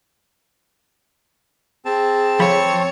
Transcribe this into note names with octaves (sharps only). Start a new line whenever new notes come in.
C4 G#4 A5
F3 A4 C#5 B5